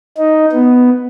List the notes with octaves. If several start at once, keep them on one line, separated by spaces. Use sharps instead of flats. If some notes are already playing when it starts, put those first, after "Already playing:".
D#4
B3